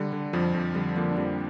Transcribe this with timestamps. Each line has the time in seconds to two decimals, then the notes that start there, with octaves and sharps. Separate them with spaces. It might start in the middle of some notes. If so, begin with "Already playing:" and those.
Already playing: D3 G3
0.13 D3
0.33 F2 F3
0.55 F2
0.75 D3 G3
0.96 D3 F3 A#3
1.11 D4
1.17 F2 G3 C4